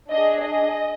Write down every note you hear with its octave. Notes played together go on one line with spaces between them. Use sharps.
D4 G#4 D#5
D#5